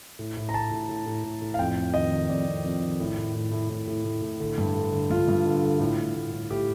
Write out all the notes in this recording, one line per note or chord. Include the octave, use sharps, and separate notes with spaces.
A2
A2
A#5
A2 A5
A2
A2
A2
A2
A2
F5
F2 G5
F2
D#3 D#5
D#3
F2 D5
F2
F2
D#3
A2
A2
A2
A2
A2
A2
A2
A2
D3
G2
D3
D3
G2 F4
G2
D3
D3
A2
A2
A2
A2
A2 G4